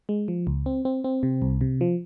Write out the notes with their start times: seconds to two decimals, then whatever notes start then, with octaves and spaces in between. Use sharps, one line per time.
0.09 G#3
0.28 F3
0.47 C#2
0.66 C4
0.85 C4
1.04 C4
1.23 C3
1.42 C2
1.61 C3
1.81 F3